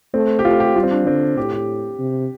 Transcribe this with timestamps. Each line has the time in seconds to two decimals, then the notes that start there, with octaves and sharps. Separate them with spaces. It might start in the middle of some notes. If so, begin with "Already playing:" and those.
0.14 A3 C4
0.39 G4
0.45 A3 F4
0.60 G4
0.76 G3 F4
0.83 C4
0.91 D4
1.06 D3 C4
1.37 A2 G4
1.52 G4
1.99 C3